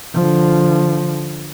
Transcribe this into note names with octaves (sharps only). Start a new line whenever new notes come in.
D3 F3